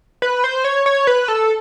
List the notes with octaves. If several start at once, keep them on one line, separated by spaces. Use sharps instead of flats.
B4
C5
C#5
C#5
B4
A4